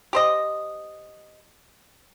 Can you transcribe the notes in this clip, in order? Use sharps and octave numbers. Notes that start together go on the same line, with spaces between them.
G4 C5 D#5